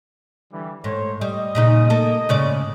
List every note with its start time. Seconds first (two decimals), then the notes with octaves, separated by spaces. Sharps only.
0.52 D3 E3 G3
0.84 G#2 A4 C5 C#5
1.21 G3 D#5
1.55 A#2 C#3 D#4
1.90 A#3 A4
2.29 G#2 C#3 D5